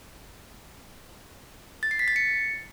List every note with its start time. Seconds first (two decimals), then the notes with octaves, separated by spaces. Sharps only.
1.83 A6
1.91 C7
1.99 B6
2.08 A6
2.16 C#7